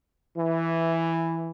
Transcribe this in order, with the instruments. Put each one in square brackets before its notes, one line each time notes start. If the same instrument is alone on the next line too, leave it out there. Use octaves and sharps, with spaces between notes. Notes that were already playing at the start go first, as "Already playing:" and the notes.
[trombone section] E3